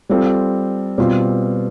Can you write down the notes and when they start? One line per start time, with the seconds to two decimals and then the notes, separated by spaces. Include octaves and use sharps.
0.09 G3 C4 F4 A4
0.98 B2 G3 C4 F4